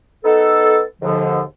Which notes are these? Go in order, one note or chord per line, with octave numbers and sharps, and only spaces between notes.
B3 D#4 A4
D#2 G#2 D3 F3